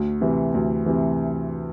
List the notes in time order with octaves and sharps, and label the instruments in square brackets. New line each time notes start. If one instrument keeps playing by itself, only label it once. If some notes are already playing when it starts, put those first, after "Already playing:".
Already playing: [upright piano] D2
C3 E3
D2
C3 E3